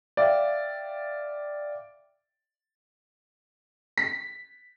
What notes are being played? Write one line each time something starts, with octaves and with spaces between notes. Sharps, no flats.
D5 E5 F5 G5
B6